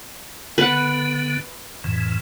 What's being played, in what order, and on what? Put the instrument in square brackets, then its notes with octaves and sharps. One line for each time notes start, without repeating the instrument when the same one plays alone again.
[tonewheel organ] D3 B3 [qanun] B4 F#5
[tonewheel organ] F2 A2 E3